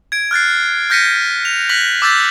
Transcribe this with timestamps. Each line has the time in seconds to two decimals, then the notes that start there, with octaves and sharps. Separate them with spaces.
0.12 G#6 D7
0.31 F6 F#6 A6 C7
0.90 F6 G6 A#6 B6 C#7 D#7
1.45 F7
1.69 F#6 A#6 B6 F#7
2.02 D6 E6 G6 A6 B6